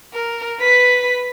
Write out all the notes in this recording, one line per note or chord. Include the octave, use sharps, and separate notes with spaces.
A#4
B4 B6